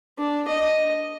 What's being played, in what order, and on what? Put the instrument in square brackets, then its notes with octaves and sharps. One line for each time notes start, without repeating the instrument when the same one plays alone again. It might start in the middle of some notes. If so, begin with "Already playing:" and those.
[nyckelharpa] D4
D#5